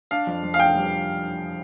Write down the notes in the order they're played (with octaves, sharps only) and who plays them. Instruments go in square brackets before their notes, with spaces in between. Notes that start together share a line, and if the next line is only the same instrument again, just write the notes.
[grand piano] D4 [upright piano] F5
[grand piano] F2
F2
[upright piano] F5
[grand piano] F2 [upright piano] G5
[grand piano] G3